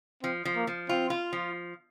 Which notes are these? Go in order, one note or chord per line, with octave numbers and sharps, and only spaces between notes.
F3 C4
F3
A#3
F3
C4 F4
F4
F3